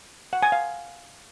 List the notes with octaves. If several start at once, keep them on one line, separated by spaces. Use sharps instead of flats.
F#5
G#5
F5